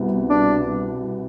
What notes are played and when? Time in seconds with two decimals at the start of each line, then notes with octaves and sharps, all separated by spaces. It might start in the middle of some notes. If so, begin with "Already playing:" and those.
Already playing: C2 B2
0.30 D4